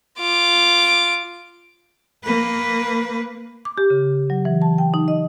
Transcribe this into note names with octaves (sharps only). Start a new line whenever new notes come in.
F4 D6
A#3 B4
D6
G4
C#3
F#3
E3
A5
G5
D#4
D#5